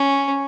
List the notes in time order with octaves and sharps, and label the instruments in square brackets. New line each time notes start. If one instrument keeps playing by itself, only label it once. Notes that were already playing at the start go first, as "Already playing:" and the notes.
Already playing: [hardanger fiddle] C#4